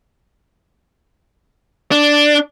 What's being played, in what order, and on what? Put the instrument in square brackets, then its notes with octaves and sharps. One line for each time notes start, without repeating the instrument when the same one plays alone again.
[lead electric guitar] D4